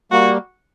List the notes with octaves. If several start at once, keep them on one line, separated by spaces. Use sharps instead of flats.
G3 A#3 F#4